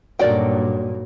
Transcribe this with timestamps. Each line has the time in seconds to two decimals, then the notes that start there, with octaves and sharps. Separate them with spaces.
0.19 G2 A#2 F#3 D#4 A4 A#4 D5 G5